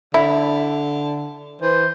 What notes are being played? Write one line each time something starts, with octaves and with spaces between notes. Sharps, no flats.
D3 E4
E3 C5